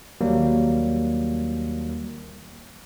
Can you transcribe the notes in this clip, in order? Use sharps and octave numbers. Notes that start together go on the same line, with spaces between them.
D#2 F#3 G3 A#3